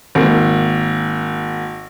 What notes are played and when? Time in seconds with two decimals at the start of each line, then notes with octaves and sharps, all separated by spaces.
0.15 G#1 A#3